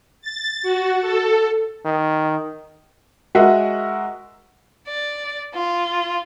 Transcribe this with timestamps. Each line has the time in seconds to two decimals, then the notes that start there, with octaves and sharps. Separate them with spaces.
0.22 A6
0.63 F#4
1.02 A4
1.85 D#3
3.35 G#3 F#4 A#4 D#5 E5 F#5
4.87 D5
5.54 F4